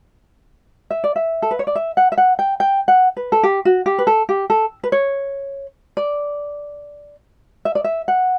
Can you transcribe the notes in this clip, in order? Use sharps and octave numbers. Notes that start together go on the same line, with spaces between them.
E5
D5
E5
A4
B4
C#5
D5
E5
F#5
E5
F#5
G5
G5
F#5
B4
A4
G4
F#4
G4
B4
A4
G4
A4
B4
C#5
D5
E5
D5
E5
F#5